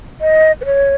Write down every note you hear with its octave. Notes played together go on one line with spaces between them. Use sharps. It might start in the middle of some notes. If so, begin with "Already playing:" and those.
D#5
B4
C#5